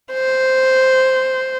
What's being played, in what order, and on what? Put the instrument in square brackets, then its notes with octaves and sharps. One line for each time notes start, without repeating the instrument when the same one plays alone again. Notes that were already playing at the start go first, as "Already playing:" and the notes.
[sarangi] C5